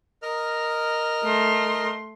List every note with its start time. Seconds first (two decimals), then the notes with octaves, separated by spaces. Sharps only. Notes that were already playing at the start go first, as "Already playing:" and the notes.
0.23 A#4 D#5 F6
1.24 A3 C6